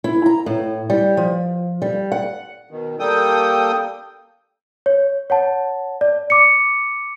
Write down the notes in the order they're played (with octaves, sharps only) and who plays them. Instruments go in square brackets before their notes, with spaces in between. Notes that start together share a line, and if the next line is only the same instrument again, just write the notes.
[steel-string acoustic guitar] E4
A#5
A2
G3
F3
G3
F#5
[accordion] B2 D#3
G3 A#3 A4 G5 D#6
[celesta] C#5
C#5 F#5 A5
D5
D6 C#7